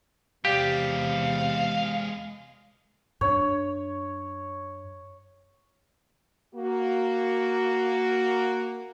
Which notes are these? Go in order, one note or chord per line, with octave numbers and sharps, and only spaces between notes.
E2 C3 G#3 G4 D5 F5
F#2 D4 C#5
A#3 F#4